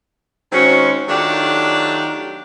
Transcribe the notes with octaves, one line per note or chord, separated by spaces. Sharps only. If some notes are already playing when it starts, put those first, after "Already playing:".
D#3 G#3 C4 C#4 F#4
D#3 F#3 A3 D4 F4 G4